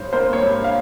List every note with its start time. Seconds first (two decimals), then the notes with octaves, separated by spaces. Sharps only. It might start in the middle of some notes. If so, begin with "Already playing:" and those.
Already playing: G2 C5 C#5
0.13 A#3 C5
0.33 C#5
0.43 G2
0.64 F5